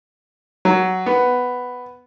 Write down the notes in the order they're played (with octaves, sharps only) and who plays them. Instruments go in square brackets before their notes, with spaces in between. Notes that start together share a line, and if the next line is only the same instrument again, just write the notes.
[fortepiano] F#3
B3